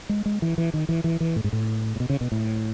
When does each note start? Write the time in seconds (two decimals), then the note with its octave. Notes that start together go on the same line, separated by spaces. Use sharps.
0.09 G#3
0.26 G#3
0.42 E3
0.58 E3
0.74 D#3
0.89 E3
1.04 E3
1.20 E3
1.36 A2
1.44 G#2
1.53 A2
1.96 A2
2.00 B2
2.10 C#3
2.21 B2
2.32 A2